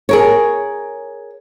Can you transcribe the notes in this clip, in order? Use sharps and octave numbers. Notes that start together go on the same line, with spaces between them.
G#4 A#4 C#5